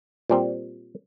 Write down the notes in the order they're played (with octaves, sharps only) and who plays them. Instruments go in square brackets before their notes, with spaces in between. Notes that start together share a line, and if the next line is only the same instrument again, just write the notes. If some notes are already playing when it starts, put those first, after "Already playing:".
[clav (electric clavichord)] A#2 G3 C4